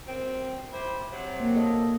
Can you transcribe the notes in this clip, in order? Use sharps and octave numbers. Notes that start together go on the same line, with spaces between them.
F#2 C4
E4 G4 C5
C3 F#3 C4
A#3
A4 D#5